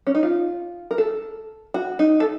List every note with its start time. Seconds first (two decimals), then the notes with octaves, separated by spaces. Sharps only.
0.07 C#4
0.15 D#4
0.23 F4
0.91 A#4
0.98 A4
1.74 F#4
1.99 D#4
2.20 A4